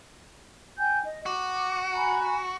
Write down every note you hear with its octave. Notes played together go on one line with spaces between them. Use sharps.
G5 G#5 G6
D#5
F#4 D6
G#5 A#5 B5